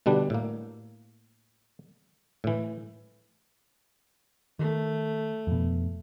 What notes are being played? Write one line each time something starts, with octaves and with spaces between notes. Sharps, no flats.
B2 D3 G3 D4
A2 A#3
A2 E3
D#3 A3
F2 B2